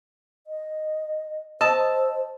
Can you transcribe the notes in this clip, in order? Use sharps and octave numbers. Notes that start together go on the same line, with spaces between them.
D#5
C5 D#5 A5 E6